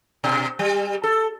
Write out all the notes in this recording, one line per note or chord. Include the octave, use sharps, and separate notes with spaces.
B2
G3
A4